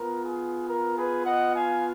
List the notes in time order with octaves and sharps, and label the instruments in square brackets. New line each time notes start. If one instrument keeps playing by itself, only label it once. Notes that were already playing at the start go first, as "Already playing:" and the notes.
Already playing: [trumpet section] B3 F4 A#4
G#4
A#4
G#4 B4
D#5 F#5
F5 G#5